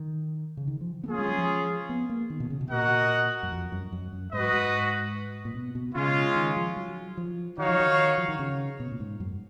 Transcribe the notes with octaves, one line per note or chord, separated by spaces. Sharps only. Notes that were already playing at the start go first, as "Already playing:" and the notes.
Already playing: D#3
C#3
D#3
F3
B3
A#3 C#4 F4 G#4
G#3
F#3
F3
B3
A#3
D#3
B2
C#3
B2
A#2 F#4 A#4 D#5 F#5
F#2
F2
F#2
F#2
F#2
G#2 F#4 B4 D#5
G#2
A#2
B2
B2
C#3 G#3 C#4 F4
D#3
F3
F#3
F3
D#3 D#4 F#4 C#5 F5
F3
D#3
F3
D#3
C#3
B2
A#2
G#2
F#2